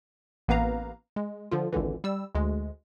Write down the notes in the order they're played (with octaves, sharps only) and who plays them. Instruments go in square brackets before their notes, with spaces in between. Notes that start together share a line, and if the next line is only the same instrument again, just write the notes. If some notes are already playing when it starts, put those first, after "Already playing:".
[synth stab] A1 A#3 B3 B4 F5 A#5
G#3
D3 F3 F4
G#1 C#2 D3 E3
G3 E6
D2 G#3